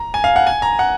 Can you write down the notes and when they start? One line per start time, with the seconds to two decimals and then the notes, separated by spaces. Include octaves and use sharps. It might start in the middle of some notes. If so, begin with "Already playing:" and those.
Already playing: A#5
0.14 G#5
0.24 F5
0.36 F#5
0.47 G#5
0.62 A#5
0.79 F#5